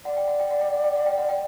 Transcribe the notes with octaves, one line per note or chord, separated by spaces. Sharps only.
D5 F#5
G5
F#5
G5
F#5
G5
F#5
G5
F#5
G5
F#5
G5